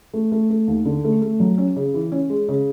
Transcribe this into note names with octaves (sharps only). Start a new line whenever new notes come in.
A3
A3
A3
D#2
D3
A3
A3
F#3
C#4
C#3
E3
C#4
G#3
C#3